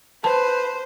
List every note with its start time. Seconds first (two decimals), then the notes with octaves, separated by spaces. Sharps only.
0.24 B4 C5 A5